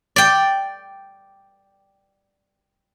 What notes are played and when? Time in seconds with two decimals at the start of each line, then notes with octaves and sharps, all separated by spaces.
0.16 D5 G5